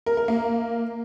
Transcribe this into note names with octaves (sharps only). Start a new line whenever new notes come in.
A#4
A#4
A#3